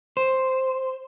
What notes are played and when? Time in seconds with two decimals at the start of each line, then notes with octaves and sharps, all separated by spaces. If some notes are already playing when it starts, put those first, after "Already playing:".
0.17 C5